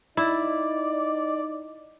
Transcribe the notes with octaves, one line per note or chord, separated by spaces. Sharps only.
D#4 E4 D5 D#5